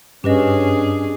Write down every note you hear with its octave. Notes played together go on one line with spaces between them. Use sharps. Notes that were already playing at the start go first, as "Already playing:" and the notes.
G2 C#4 D4 G4 G#4 B4 D#5